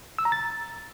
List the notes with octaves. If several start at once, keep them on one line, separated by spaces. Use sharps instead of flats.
E6
A#5
A6